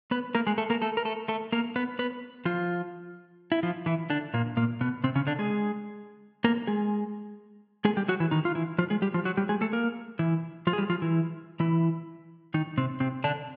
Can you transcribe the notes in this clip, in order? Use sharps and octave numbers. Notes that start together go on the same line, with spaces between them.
B3 B4
A#3 A#4
G#3 G#4
A3 A4
A#3 A#4
A3 A4
A#4
A3 A4
A3 A4
A#3 A#4
B3 B4
B3 B4
F3 F4
E4
F3 F4
E3 E4
D3 D4
A#2 A#3
A#2 A#3
B2 B3
C3 C4
C#3 C#4
D3 D4
G#3 G#4
A#3 A#4
G#3 G#4
G#3 G#4
G3 G4
F#3 F#4
E3 E4
D#3 D#4
F4
E3 E4
F3 F4
G#3 G#4
G3 G4
F3 F4
F#3 F#4
G3 G4
G#3 G#4
A3 A4
A#3 A#4
E3 E4
F3 F4
G#4
G3 G4
F3 F4
E3 E4
E3 E4
D#3 D#4
C3 C4
C3 C4
D3 D4